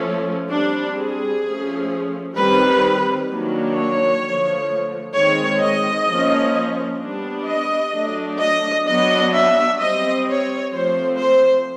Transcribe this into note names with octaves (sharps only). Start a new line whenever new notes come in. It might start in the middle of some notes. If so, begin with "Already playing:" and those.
Already playing: F3 A3 C#4
G3 C4 D4
G#4
F3 A3 C#4
D#3 G3 C4 B4
D#3 F#3 A#3 D4
C#5
D3 F3 A3
D#3 G#3 C4 C#5
D#5
F3 A#3 C#4
G3 B3 D4
D#5
F#3 A3 D4
D#5
F#3 B3 D4 D#5
E5
G3 C4 D#5
C#5
F3 A3 C4 C5
C5